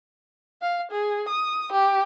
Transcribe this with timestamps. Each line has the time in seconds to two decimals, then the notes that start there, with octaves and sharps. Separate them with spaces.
0.62 F5
0.91 G#4
1.29 D#6
1.72 G4